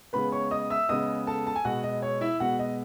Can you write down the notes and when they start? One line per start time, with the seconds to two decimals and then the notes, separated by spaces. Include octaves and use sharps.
0.13 C#3 G#3 B3 B4 B5
0.32 C#5 C#6
0.51 D#5 D#6
0.70 E5 E6
0.89 C#3 G#3 B3 D#5 D#6
1.27 A4 A5
1.47 A5
1.56 G#5
1.64 B2 G#3 B3 F#4 F#5
1.83 D#5
2.02 C#5
2.21 E4 E5
2.40 B2 G#3 B3 F#4 F#5
2.59 D#5